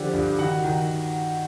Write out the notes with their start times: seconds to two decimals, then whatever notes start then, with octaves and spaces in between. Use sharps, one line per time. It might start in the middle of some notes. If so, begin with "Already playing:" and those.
Already playing: D3 F3 G4
0.14 G2
0.39 D#3 F#4 F#5
0.64 D#3